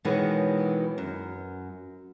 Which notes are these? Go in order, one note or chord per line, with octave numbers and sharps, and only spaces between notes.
B2 D#3 E3 F#3 G#3 B3
F#2